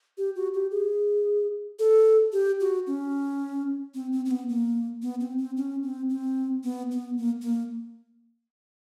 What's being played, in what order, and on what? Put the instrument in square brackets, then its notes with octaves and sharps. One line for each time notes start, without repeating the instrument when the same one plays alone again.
[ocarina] G4
F#4
G4
G#4
A4
G4
F#4
C#4
C4
C4
C4
B3
A#3
B3
C4
C4
C#4
C4
C4
B3
B3
A#3
A#3